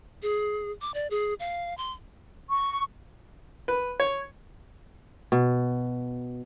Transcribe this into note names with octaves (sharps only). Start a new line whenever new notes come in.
G#4
D6
D5
G#4
F5
C6
C#6
B4
C#5
B2